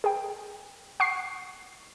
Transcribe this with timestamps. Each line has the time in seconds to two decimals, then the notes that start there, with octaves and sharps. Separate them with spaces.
0.04 G#4 G5
1.00 F#5 C#6 C7